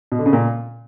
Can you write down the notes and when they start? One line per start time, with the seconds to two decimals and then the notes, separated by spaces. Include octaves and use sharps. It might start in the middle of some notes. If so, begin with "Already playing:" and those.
0.12 B2
0.19 D3
0.26 C#3
0.33 A#2